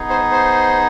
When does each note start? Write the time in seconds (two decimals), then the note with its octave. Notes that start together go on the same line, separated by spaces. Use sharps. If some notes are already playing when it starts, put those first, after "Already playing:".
Already playing: B3 D#4 G#4
0.10 C5
0.32 C5